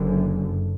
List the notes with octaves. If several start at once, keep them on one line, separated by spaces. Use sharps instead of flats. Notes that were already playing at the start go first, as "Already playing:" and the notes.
Already playing: F#1 F#2 D3